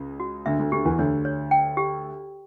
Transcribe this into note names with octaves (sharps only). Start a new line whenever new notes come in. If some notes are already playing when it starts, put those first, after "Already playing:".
Already playing: C#2 C#3
F#4
D2 D3 E5
D2 D3
D2 D3 G4
E2 E3
D2 D3 C#5
C#5
G5
G4